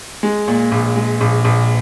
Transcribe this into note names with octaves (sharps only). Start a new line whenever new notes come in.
G#3
A#2
A#1
G#3
A#1
A#1